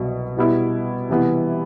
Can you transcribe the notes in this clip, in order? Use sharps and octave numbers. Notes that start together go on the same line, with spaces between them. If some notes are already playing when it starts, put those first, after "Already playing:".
Already playing: C2 B2 F#3
B2 G3 B3 E4
C3 E3 G3 B3 E4